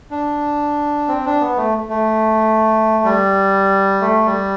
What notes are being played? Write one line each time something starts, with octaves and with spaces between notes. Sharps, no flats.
D4
C4
D4
B3
A3
A3
G3
A3
G3